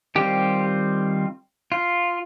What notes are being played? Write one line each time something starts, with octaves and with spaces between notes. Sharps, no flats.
D#3 G3 C4 F4 G4
F4